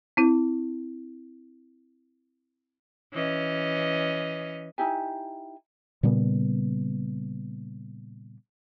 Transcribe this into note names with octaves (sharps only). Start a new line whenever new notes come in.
C4 E4
E3 C#4 D#5
D#4 E4 G4 G#5
A#2 C#3 G3 B3